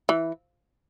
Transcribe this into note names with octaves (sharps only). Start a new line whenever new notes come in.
E3